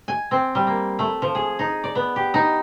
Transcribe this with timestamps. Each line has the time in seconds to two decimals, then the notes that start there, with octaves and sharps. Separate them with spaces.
0.08 G#5
0.31 C4
0.55 G3
0.67 A#3
0.99 A3
1.22 F3
1.35 G#4
1.59 D#4
1.84 D5
1.95 B3
2.16 G4
2.34 D#4